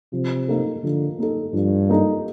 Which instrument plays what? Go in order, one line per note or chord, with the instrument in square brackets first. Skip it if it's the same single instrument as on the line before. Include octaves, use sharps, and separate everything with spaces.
[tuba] C3 [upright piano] F3
[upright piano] A#3 D#4 A4
[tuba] D3 [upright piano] F3
[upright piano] A#3 D#4 A4
[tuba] G2 [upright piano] F3
[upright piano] A#3 D#4 A4